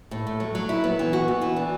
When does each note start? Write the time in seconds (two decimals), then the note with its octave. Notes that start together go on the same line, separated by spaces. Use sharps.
0.11 A2
0.27 A3
0.40 F#3
0.55 F#3
0.69 E4
0.84 B3
0.99 E3
1.13 F#4
1.28 B3
1.41 E3
1.56 D4